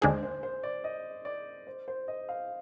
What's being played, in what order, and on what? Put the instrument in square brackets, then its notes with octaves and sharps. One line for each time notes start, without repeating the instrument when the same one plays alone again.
[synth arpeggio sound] D#2 D3 G#3 D4 G#4 [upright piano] C5
[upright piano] C5
C5
D5
D#5
D5
C5
C5
D#5
F5